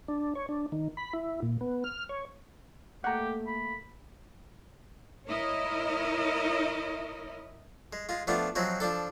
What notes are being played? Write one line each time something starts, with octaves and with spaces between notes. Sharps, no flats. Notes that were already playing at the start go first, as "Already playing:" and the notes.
D4
C#5
D4
D#3
B5
E4
A#2
B3
F6
C#5
A3 A#3 G4 F#5 A#5
B5
E4 A#4 C#5 D#5
G#3
G#3 F4
F3 A3 B3 D4 F4
F3 F#3 G#3 C4 F#4
F3 D4 A4